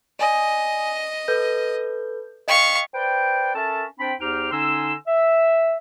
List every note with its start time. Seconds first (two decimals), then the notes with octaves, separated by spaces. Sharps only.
0.19 D5 D#5 G#5 D#6
1.28 A4 B4 G6
2.48 D#5 F5 G5 C#6 B6
2.94 B4 C5 D5 G5
3.54 C#4 A4 A#4 E5 A5
3.99 C4 D4 C5 G5 B5
4.20 E2 D#4 G4 C5 G5 F6
4.52 D3 C#4 D#4 G#5 C6 E6
5.07 E5